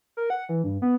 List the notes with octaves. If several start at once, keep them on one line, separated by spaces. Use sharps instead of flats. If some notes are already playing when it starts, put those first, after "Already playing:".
A#4
F#5
E3
G2
B3